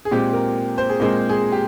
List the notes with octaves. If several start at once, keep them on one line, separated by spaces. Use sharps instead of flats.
G#4
A#2 G#3 C4 G4
A#4
C5
G#4
A#2 G#3 C4 A#4
G#4
G4